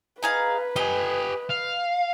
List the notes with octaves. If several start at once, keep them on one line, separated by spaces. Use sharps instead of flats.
D#4 G#4 B4 F5
G4 D#5 G#5
F5